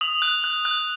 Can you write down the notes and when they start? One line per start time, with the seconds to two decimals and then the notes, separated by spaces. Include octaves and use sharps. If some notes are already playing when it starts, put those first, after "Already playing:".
0.01 D#6 F7
0.22 F#6
0.44 F#6
0.65 F#6